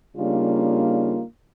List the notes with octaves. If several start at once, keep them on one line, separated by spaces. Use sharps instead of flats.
C#3 G3 A#3 D4 D#4 F4